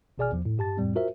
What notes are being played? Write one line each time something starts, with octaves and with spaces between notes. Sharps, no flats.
G#1 B2 G#4 D5 G#5 F6
E2 F3
A2
G2 G4 A5 A6
F2 A2 G3 C4
F4 F#4 A#4 C5 E5